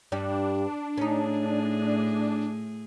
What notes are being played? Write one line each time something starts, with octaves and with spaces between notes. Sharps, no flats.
G2 G3 D4
A2 C#4 D#4 G#4